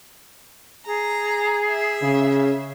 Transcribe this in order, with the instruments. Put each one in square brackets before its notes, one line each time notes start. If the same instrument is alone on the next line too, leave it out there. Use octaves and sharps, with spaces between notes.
[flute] G#4 [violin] A#5
[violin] E5
[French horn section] C#3